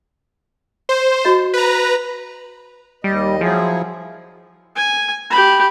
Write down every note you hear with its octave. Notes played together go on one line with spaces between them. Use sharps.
C5
F#4 D#5
B4 A#5
D#2 G3 D#5
F3 F#3 E4 G#4
G#5
G4 B5